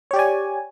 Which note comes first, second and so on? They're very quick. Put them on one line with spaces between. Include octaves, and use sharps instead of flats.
C#5 G4 D5 G#5